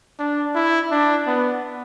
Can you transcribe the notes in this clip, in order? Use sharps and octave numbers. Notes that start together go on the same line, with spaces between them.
D4
E4
D4
B3